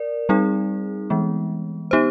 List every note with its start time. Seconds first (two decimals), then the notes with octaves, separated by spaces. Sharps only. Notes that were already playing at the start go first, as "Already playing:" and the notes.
Already playing: A#4 D5
0.29 G3 C4 D#4 G#4
1.10 E3 G#3 B3
1.91 B3 D#4 G4 C5